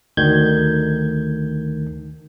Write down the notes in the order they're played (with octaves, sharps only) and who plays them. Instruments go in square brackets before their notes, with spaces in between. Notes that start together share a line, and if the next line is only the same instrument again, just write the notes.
[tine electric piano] D2 D#3 G6 G#6